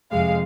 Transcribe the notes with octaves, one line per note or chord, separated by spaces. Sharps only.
F2 C3 G#3 F5